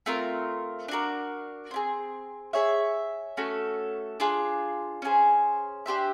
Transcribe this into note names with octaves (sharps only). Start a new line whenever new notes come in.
A3 C4 F4 A#4
D4 F#4 A#4
C4 E4 G#4
G#4 C#5 E5
A3 C#4 F#4 A4
D4 F4 G#4
C#4 E4 G#4 C5
D4 G4 C5 E5